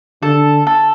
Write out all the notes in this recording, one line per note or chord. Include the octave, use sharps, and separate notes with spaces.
D3 A4
A4